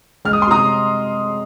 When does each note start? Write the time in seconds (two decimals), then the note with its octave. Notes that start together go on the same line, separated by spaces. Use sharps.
0.25 G#3 F6
0.33 D#6
0.42 C6
0.47 C3 A#5 D#6